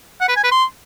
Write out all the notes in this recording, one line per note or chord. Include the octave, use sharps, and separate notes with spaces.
F#5
B4
G#5
B4
C6